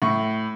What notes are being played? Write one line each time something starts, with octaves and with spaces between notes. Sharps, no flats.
A2 C#6